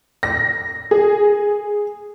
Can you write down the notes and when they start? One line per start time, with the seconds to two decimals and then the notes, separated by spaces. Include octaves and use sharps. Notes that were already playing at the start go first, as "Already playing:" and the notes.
0.23 A#6
0.91 G#4